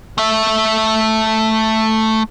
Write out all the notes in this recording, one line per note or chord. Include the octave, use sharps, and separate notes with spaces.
A3 E5